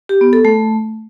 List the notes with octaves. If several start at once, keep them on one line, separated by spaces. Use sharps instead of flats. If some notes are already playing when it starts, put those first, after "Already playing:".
G4
B3
A4
A3